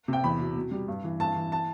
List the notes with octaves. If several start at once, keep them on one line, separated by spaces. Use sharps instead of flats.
C3 G5
E2 B5
B2
B2
G3
G2
E3
G2 A5
E3
A5